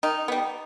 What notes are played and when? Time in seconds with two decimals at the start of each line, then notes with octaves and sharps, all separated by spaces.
0.03 D#3 D#4
0.28 G3 B3